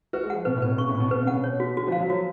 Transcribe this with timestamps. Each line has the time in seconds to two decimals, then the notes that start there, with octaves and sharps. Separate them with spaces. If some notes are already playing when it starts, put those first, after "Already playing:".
0.13 F#4 B4
0.23 G#3
0.30 F3 F#5
0.45 B2 B4
0.57 A2
0.62 B4
0.68 B2
0.78 C#3 C#6
0.89 A2
0.95 C#6
1.00 B2
1.11 B2 B4
1.22 C#3
1.27 F#5
1.33 B2
1.44 C#5
1.60 F#4
1.77 D3 F#4
1.87 F3
1.92 F5
1.98 F#3
2.10 F3 F#4